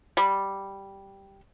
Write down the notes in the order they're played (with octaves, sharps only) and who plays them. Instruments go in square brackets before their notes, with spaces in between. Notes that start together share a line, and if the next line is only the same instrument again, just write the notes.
[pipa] G3